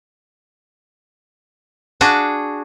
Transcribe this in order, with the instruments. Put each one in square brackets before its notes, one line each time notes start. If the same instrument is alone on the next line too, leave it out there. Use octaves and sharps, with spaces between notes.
[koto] D4 F#4 G#4